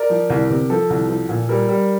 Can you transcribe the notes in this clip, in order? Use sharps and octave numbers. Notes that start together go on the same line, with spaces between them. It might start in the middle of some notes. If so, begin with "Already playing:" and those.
Already playing: A#4 D5
F3
C2
C3
F3 A4
C2
F3
A#2
G3 A#4
G3